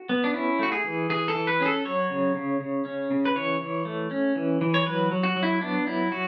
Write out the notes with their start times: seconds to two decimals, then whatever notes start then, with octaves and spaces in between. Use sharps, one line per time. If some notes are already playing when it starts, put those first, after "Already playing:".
Already playing: F#4
0.09 B3
0.24 D4
0.34 C#4 E4
0.59 A3 F#4
0.72 G#4
0.84 E3
1.10 E3 G#4
1.28 A4
1.35 E3
1.47 B4
1.60 C#4 G#4
1.66 A4
1.85 F#3 C#5
2.10 C#3
2.35 C#3
2.60 C#3
2.85 C#4
3.11 C#3
3.25 B4
3.35 E3 C#5
3.61 E3
3.85 A3
4.11 C#4
4.36 E3
4.61 E3
4.74 C#5
4.86 F#3 B4
5.11 F#3
5.23 F#4
5.36 F#3
5.43 E4
5.61 B3 D4
5.87 F#3 E4
6.12 F#3 F#4